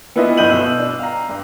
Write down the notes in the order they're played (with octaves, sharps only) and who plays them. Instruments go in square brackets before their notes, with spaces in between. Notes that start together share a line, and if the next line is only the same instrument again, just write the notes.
[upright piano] B3 D4 E4 F4 B4 D#5
G1 D4 D#5 G6 D#7 F#7
B2 E6 F#7
D4
F5 A#5
G2